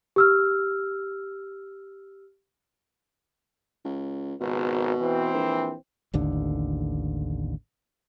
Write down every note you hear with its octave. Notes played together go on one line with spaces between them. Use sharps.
G4 E6 F6
C#2
G#1 C#2 B2
E3 C4
A#1
A1 D#2 D3